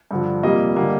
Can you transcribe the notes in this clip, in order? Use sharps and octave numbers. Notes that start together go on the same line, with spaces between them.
G2 D3 F3
F2 C3 G3 A#3 D#5
D3 G3 A#3